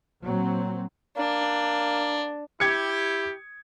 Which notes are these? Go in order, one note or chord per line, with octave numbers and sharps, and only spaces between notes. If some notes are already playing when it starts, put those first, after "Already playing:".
A#2 F#3 C4
A#3 D4
E4 G4 G#6 C#7